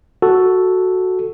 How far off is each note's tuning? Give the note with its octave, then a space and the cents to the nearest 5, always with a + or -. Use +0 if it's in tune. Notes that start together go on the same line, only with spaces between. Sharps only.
F#4 +0 A4 +0